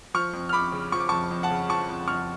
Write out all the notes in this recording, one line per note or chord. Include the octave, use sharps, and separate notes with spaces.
F3 C#6 F6
F2
F6
F2 B5 D6
C#3
F3 C#6
D6
A5 C#6
F2
F2
F#5 A5
C#3
F3 A5 C#6
F2
F2 C#6 F6